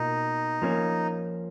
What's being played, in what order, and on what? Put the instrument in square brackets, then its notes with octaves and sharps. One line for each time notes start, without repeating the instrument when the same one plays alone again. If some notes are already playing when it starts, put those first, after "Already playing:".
Already playing: [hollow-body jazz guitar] B2 A#3 F4 [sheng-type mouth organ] D#4
[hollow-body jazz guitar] F3 A#3 C#4